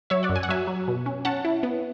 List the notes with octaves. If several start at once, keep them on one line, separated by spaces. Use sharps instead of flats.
F#3 C#5 E5
D5 F#5
F#2
G#5
F#5
F#3 E5 G#5
F#3
B2
C#4
C#4 F#5 A5
E4
B3